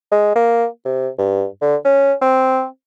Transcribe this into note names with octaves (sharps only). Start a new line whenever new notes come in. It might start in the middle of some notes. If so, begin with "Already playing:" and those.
G#3
A#3
C3
G2
D3
C#4
C4